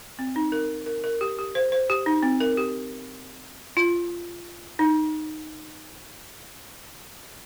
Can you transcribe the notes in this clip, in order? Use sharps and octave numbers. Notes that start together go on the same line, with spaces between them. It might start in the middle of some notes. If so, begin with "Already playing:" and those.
C4
D#4
A#4
A#4
A#4
G4
G4
C5
C5
G4
D#4
C4
A#4
G4
F4
D#4